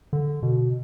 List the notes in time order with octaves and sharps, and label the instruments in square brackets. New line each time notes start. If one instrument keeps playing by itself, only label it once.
[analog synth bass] D3
B2